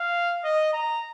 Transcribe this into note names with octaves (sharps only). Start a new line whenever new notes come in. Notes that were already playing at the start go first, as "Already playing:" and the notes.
Already playing: F5
D#5
A#5